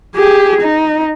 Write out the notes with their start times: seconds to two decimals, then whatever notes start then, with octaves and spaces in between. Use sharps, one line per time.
0.15 G4 G#4
0.61 D#4